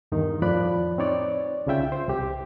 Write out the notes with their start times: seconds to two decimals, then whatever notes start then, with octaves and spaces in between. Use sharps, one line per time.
0.12 E2 G2 D#3 D#4
0.42 F2 A2 F3 D5 B5 F#6
0.98 C4 D#4 C#5 D5
1.66 C2 C#3 F4 E5 G5
1.92 C5
2.08 C2 G4 G5